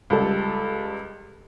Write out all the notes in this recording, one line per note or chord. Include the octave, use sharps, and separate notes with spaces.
C#2 G3 A4